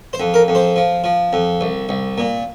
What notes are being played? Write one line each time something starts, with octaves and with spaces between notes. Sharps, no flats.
C5
F2
A#4
F2
C5
F3
F3
F2
C2
C2
A#2